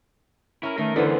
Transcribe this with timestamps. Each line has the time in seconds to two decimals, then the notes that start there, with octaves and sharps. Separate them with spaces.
0.63 C#4 E4 A#4
0.78 D#3 A3 A#4
0.96 F2 D3 E3 A3 B3 D4 C5